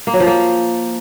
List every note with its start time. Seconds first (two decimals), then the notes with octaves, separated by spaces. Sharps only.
0.07 A#3
0.13 F#3
0.20 F3
0.27 A#3